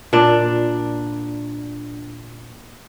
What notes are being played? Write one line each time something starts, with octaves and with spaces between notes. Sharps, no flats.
A#2 D4